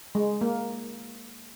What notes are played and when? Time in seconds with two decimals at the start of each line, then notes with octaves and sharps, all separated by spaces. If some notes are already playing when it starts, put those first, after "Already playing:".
0.15 G#3
0.41 A#3